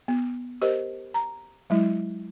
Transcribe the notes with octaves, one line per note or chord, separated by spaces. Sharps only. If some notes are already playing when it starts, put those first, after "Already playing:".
B3
G4 A#4 C5 D#5
A#5
F#3 G#3 E4